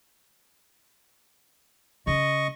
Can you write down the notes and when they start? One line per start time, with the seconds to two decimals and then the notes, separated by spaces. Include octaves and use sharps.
2.07 C#3 D#5 C#6